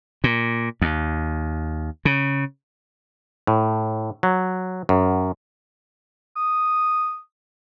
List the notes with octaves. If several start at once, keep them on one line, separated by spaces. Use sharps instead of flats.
A#2
D#2
C#3
A2
F#3
F#2
D#6